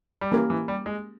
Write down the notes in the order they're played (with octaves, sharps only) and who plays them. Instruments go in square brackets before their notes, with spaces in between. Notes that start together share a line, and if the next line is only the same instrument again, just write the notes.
[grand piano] G3
[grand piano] E3 [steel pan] A#3 C#4 G4 A#4
[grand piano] E3
G3
G#3